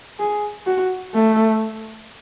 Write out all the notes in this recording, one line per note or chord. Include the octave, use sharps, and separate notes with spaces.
G#4
F#4
A3